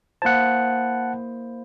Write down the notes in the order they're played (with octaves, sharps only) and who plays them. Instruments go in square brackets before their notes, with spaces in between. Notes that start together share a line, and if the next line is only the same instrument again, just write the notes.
[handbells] A#3 E4 C5 [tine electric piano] F#5 A5